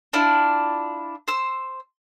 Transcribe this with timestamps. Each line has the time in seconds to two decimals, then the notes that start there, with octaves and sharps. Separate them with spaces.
0.13 D4 E4 F4
1.28 C5 E6